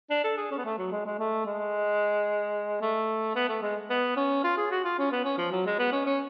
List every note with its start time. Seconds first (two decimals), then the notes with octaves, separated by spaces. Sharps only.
0.10 D4
0.24 A4
0.37 G#4
0.51 C#4
0.58 B3
0.65 A3
0.78 F#3
0.92 G#3
1.05 G#3
1.19 A3
1.46 G#3
2.81 A3
3.35 B3
3.49 A3
3.62 G#3
3.90 B3
4.16 C#4
4.44 F4
4.57 G#4
4.71 F#4
4.84 F4
4.98 C#4
5.11 B3
5.25 C#4
5.38 F3
5.52 F#3
5.66 G#3
5.79 B3
5.92 C#4
6.06 C#4